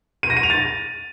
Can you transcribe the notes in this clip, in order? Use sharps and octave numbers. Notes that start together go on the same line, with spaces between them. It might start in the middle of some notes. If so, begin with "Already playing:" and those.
D#7
A#6
D#7
F7
A6